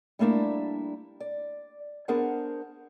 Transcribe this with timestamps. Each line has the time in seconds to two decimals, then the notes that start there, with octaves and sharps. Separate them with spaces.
0.19 G3 A3 A#3 D4 E4
1.20 D5
2.08 B3 D4 G#4 A#4 C5 F#5